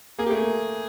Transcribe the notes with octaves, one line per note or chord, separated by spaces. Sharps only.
A#3 G#4
G4
A3 G#4
A#3